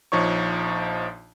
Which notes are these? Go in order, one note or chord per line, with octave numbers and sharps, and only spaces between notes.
A#1 F3 D#4 C#5 C#6